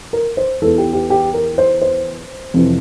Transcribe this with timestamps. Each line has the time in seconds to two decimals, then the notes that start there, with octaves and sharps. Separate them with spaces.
0.13 A#4
0.37 C5
0.62 E2 E3 A4
0.78 G4
0.93 G4
1.10 G4
1.34 A#4
1.58 C5
1.82 C5
2.54 F2 C3 E3